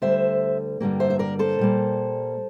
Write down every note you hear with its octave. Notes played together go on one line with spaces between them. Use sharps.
D2 D3 G3 C5 E5
G2 D3 G3 A#3
C5 E5
E5
A#4 D5
A4 C5
A#2 G3 A#3